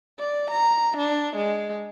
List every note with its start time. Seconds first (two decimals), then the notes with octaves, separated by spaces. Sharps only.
0.19 D5
0.51 A#5
0.97 D4
1.36 G#3